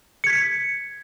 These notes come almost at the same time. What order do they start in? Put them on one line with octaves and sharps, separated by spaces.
C#7 G#6 B6